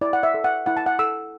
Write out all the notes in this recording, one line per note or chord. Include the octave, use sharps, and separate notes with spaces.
E4 D5
F#5
E5
A4
F#5
E4 F#5
A5
F#5
A4 E6